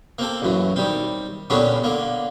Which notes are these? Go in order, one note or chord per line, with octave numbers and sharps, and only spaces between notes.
A#3 C4 A4
A1 F#2 E3
D#3 G3 C4
A#2 D3 G3 B3 C#4 D4
D3 A#3